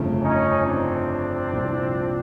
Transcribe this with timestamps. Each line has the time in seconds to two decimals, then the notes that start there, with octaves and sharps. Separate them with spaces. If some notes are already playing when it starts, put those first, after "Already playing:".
Already playing: G1 F2 C#3 F3 A3
0.22 C#4 D#4
0.66 C4 D4
1.53 C2 A#2 F3